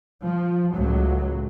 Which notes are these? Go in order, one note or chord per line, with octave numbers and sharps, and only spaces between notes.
F3
C#2 A2 F#3